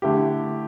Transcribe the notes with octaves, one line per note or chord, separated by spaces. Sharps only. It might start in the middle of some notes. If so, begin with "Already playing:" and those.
D3 A3 E4 G4